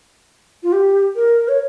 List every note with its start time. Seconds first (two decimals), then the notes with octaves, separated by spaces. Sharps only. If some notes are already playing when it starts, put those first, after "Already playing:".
0.63 F4
0.72 G4
1.16 A#4
1.48 C#5